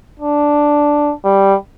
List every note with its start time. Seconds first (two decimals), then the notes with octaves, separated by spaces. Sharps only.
0.20 D4
1.25 G3